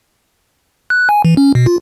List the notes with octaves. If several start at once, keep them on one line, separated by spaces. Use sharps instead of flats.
F#6
G#5
E3
C#4
B2
F4